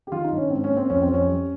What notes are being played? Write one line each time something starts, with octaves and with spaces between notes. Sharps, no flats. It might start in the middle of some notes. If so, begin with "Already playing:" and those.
G4
D#3 F4
D#4
G2
C#4
G#2 C4
C#4
A#3
C4
F2 C#4
C4
F2
C#4
G3